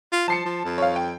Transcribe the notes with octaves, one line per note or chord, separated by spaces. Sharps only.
F4
F3 A5 C7 C#7
F3
F2
C#5 F5
G5